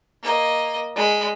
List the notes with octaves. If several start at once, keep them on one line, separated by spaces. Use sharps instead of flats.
A#3 D#5
G#3 B5